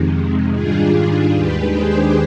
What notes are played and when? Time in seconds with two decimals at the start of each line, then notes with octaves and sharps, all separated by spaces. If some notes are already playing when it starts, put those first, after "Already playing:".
Already playing: F2 C3 D#3 G#3
0.53 G#2 D#3 G3 D4 F4 G#4
1.32 D#2 D#3 G#3 D4 G4 B4
1.72 G#4 C5